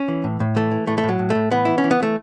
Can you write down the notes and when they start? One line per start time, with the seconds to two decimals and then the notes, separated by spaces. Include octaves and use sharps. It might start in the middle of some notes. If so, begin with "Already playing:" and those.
Already playing: C#4
0.08 E3
0.24 A2
0.40 A2
0.56 E3 A3
0.71 E3
0.87 A2 A3
0.98 A3
1.04 A2
1.09 F#3
1.19 A2
1.30 A2 A3
1.51 E3 B3
1.65 E3 E4
1.78 C#4
1.84 E3
1.91 B3
2.00 E3 A3